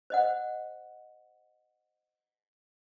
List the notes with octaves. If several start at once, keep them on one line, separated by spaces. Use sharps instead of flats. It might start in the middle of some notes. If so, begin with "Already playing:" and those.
C5 D#5 F#5